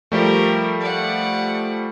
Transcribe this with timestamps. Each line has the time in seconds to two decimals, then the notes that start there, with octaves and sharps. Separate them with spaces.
0.12 F3 G3 A3 G4 A#4
0.81 D5 F#5